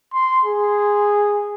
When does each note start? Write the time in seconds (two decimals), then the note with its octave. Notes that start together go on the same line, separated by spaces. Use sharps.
0.13 C6
0.44 G#4